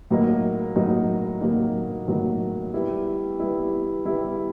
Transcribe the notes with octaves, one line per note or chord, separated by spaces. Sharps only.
A2 F#3 A#3 D#4
A2 F#3 A#3 D#4
A2 F#3 A#3 D#4
A2 F#3 A#3 D#4
G3 B3 E4
G3 B3 E4
G3 B3 E4